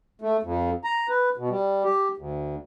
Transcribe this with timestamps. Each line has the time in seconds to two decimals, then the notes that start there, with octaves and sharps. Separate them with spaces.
0.22 A3
0.43 F2
0.84 A#5
1.09 B4
1.37 B2
1.50 G3
1.84 G4
2.17 D2